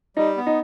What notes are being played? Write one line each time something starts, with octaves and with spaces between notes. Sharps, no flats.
G3 D#4
B3
D#4